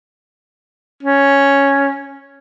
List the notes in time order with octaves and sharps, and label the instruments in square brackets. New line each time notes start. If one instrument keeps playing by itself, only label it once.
[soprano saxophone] C#4